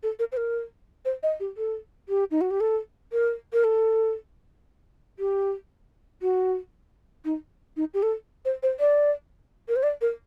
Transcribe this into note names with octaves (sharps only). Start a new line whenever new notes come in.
A4
A#4
C5
A#4
C5
D#5
G4
A4
G4
D#4
F#4
G4
A4
A#4
A#4
A4
G4
F#4
D#4
D#4
G4
A4
C5
C5
D5
A#4
C5
D5
A#4